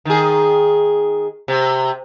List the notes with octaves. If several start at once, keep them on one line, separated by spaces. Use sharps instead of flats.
D#3 G#4
C3